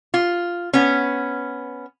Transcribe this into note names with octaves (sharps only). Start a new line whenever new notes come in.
F4
B3 C#4